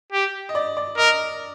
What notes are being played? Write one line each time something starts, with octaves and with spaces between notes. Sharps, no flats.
G4
D#5
D5
D5
A#4 D#5